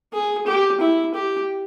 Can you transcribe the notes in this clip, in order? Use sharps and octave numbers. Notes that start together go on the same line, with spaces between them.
G#4
G4
E4
G4